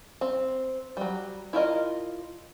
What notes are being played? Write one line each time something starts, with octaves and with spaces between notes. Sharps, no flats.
C4
F#3 G3
E4 F4 A#4 D#5